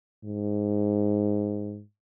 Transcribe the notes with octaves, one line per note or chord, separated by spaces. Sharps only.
G#2